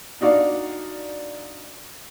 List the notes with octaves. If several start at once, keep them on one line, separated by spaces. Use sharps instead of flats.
D4 D#4 F#4 D5 F5